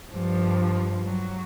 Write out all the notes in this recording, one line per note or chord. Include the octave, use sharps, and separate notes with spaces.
G2 F3
F#3